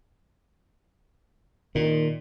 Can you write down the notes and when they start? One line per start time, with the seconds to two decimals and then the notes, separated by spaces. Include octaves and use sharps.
1.75 A#2 D#3